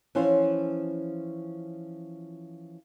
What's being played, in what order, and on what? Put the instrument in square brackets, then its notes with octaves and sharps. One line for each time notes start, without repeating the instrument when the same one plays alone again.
[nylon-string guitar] E3 F3 C#4 F4 C5 C#5